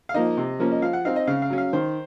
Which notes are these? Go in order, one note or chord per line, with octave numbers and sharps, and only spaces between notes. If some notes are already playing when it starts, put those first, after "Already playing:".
F5
F3 A#3 D#4 D#5
C3
F3 A#3 C#4
D#5
F3 F5
F#5
C4 D#4 F5
D#5
C#3 F5
F5
F#3 C#4
F5
D#3 C5